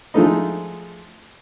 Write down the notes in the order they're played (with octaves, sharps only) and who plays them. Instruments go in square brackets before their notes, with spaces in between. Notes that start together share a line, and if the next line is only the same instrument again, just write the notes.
[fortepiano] F3 G#3 A3 D#4